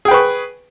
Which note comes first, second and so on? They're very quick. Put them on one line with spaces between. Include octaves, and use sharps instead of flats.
G#4 G5 B4 C#6